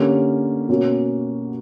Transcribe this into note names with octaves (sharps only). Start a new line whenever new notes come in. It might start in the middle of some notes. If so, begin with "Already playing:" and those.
Already playing: D3 A#3 C#4 G4
B2 A#3 C#4 F#4